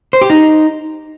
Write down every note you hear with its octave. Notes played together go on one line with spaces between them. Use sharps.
C5
G4
D#4